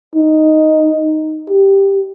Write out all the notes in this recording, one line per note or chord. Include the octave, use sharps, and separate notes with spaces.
D#4
G4